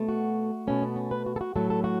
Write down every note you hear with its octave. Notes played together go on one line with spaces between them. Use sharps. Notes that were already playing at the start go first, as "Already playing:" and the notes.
Already playing: B2 A3
F#4
B2 A3 C#4
B3
C#4
B4
F#4
A4
F#4
A2 F#3 A3 A4
A4
F#4